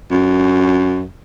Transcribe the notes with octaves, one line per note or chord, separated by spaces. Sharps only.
F#2